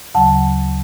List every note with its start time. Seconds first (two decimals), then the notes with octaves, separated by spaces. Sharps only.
0.15 D2 C#3 F#3 F#5 A5